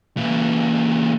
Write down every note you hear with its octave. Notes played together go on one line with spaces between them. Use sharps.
A#2 E3